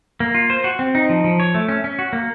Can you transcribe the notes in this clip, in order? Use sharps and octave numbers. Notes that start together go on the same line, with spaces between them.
A#3
F4
C5
F#4
C4
D#4
F3
F3
C#5
A3
C#4
C#4
F#4
A#3